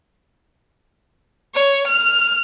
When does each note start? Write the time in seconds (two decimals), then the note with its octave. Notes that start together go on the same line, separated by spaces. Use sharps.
1.55 C#5
1.88 F6